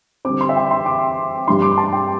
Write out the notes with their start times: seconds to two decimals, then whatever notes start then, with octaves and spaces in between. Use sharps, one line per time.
0.25 D3 G3 C4 D6
0.41 C6
0.49 E5
0.56 G5
0.71 C6
0.86 D6
1.48 G2 G3 D4 C6
1.62 D6
1.78 A5
1.93 G5